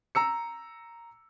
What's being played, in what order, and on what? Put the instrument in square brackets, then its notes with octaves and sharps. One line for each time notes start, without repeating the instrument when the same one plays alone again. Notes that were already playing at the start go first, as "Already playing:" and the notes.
[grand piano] A#5 E6 C#7